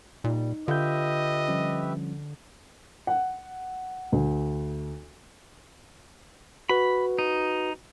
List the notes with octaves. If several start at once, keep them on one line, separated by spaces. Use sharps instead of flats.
A#2 G3 D#4
D3 F4 G4 B4 D#5 E5 G6
F3 G3 C#4
F#5
D2
F#4 B4 B5
D#4